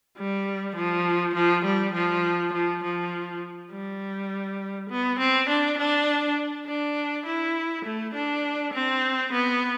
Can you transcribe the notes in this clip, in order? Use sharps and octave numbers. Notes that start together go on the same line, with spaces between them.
G3
F3
F3
G3
F3
F3
F3
G3
B3
C4
D4
D4
D4
E4
A3
D4
C4
B3